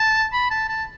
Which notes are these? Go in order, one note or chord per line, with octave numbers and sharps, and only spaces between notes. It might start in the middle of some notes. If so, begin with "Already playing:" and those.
Already playing: A5
B5
A5
A5